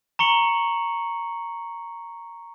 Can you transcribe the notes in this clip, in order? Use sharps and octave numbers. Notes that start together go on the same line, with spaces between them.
A#5 C#6 C#7 F#7